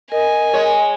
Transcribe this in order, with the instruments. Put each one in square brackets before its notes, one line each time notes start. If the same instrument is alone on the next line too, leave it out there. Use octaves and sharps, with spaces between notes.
[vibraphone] A#4 [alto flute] D#5 [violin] G#5
[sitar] G#3 C#5